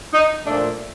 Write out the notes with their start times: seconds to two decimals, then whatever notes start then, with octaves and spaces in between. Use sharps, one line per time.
0.13 D#4
0.45 A#2 F3 A3 D4